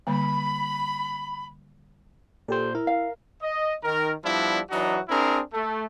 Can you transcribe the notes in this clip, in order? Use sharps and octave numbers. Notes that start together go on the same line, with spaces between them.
D3 G3 A#3 B5
A#2 G4 A4 C5
E4 A#4
F5
D#5
D#3 A#4
F3 G3 B3 D4 E4
E3 F#3 D4 D#4 F#4
C4 D4 E4 G#4 A#4
A3